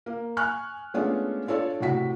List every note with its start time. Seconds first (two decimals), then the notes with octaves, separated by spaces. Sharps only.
0.06 A#3
0.37 G#5 C#6 F6 F#6
0.94 G#3 A3 B3 C#4 D4 F4
1.47 D4 F4 A4 C#5 D5
1.80 A2 C3 F#4 B6